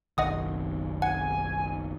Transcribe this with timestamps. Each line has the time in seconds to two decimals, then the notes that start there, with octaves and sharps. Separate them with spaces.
0.18 F#1 B1 D#3 D#5 F#5 D#6
1.02 F#5 G#5